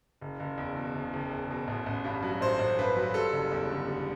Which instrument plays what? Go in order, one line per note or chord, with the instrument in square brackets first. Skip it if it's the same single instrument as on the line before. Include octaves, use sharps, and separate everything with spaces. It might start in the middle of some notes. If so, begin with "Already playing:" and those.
[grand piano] F#1
F#1
E2
B2
F#1
F#1
E2
B2
A1
A1
G2
F#3
A1 C5
A1
G2 B4
F#3
G3 A4
F#1
E2
D3
G3